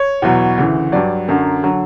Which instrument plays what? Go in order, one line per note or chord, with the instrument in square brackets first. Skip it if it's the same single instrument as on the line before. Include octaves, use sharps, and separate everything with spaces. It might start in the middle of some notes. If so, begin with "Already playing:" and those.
Already playing: [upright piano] C#5
E2 B2 F#3
D2 C#3 E3
G2 F#3 D5
F#2 D3 F#3
D3 F#3